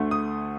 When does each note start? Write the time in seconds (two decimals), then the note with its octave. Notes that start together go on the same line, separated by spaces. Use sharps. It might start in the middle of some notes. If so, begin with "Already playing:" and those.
Already playing: D2 D3 A3
0.11 D#6